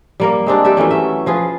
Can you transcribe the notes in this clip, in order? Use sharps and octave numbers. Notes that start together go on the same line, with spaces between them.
G3 A#3 A#4
G#3 C4 D4 G4
G3 G4 D5 E5
E3 F#3 A3 C#4
E5
F3 F4 G#4 B4